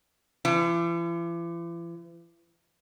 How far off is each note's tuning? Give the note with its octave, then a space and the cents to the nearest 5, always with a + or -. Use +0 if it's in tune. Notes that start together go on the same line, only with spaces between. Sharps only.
E3 +45